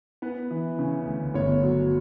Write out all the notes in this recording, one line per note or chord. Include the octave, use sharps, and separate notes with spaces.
B3 B4
E3
C#3
D2
G1 C#5
F#3